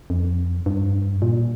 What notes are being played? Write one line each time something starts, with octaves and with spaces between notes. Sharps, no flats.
F2
G2
A#2